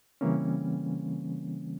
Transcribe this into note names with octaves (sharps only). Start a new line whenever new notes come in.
C#3 E3 G3 A#3 C4 C#4